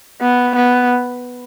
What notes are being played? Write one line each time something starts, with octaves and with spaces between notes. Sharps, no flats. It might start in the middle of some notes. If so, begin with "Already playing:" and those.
B3
B3